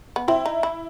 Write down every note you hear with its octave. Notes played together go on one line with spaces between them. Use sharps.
B3
C4 E4
D#4
E4